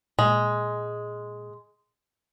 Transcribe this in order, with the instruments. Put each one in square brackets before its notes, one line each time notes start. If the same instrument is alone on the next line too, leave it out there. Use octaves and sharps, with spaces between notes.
[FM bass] A#2 [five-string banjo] G#3